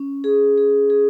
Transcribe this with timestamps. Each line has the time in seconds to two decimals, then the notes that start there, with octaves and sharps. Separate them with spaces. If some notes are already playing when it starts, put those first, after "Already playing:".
Already playing: C#4
0.24 G#4
0.58 G#4
0.90 G#4